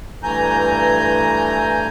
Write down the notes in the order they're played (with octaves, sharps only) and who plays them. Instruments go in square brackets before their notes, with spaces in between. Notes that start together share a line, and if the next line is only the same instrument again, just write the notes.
[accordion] G2 E3 A3 G#5 A#5 G6